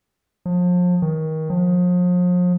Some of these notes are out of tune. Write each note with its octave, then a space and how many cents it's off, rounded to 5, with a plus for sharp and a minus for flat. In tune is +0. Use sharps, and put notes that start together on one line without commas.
F3 +35
D#3 +25
F3 +40